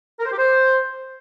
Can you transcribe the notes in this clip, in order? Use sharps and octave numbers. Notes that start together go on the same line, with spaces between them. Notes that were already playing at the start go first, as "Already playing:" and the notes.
A#4
C5
G4
C5